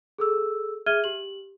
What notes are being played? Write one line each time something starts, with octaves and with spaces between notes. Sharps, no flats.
G#4 A4 E6
G#4 E5 F6 G#6 D#7 G7
G4 F#7